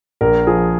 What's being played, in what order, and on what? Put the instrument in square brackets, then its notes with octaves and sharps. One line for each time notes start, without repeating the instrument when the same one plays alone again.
[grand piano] A#1 A#4
F3 G#4